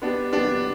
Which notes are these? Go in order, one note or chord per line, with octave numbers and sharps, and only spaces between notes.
B3 D4 G4
B3 D4 G4